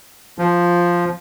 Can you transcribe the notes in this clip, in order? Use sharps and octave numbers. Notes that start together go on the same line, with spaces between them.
F3